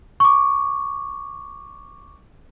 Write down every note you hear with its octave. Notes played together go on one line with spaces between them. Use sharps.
C#6 D6